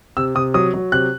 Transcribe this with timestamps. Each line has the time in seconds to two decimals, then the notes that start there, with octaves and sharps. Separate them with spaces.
0.17 C3 E6
0.35 C3 D#6
0.54 F#3 D#6
0.74 F#3
0.92 C3 F#6